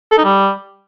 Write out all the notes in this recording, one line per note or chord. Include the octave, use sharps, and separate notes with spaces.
A4
D#4
G3